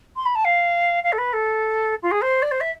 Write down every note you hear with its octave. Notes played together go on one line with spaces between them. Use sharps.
C6
B5
A5
F5
F5
A4
B4
A4
F4
G#4
C5
D5
C5
E5